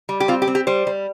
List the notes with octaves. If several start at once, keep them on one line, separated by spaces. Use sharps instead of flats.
G3
G4
C4 F4
G4
C4
G4
G3 C5
G3